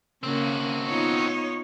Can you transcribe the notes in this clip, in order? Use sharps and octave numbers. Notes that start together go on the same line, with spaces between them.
C#3 A#3 C4 F#4
B3 D#4 F4 C#5